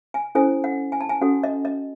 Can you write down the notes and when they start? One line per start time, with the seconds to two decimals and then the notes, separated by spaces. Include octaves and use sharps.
0.14 G#5
0.35 C#4 E4 A4 C5 G#5
0.64 F#5
0.92 G#5
1.01 A5
1.09 G#5
1.21 C#4 F#4 A4 F#5
1.44 D#5
1.65 D#5